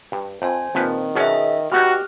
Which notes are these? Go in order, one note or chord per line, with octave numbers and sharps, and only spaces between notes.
G2
F2 C5 G#5
A#1 D#3 F3 C4 B4
B2 F#3 C#4 G#4 D#5 E5
G3 B3 D#4 F#4 G4 F6 F#6